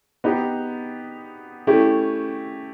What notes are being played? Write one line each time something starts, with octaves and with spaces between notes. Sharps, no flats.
B3 D#4 G4
A3 C#4 E4 G4